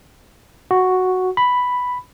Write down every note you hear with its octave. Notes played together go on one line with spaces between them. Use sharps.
F#4
B5